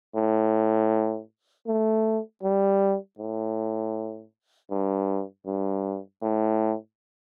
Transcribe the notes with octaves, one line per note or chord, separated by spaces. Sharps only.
A2
A3
G3
A2
G2
G2
A2